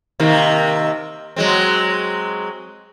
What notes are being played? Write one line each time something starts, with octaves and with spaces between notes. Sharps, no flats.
C3 D#3 A#3
F#3 G#3 C4